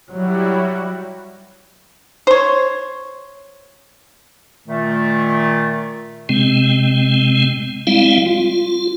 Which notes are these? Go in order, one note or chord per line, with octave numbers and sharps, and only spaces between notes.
F#3 G3 E4 F#4
C5 C#5
A#2 D#3 A3
C3 G#3 C4
G3 G#3 C4 E4 F5
F4